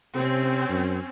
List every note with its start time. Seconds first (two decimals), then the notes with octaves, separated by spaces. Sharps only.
0.15 C3 C4 C#4
0.69 F#2